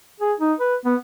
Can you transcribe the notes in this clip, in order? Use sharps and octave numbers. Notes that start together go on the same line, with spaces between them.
G#4
D#4
B4
B3